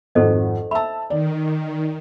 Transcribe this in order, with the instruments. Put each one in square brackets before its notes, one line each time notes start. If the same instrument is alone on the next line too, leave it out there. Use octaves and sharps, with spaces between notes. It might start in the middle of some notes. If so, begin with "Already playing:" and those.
[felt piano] G#1 F2 [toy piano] A4 C5 D#5
[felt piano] E5 A5 [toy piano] B5 E6
[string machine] D#3 [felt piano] D5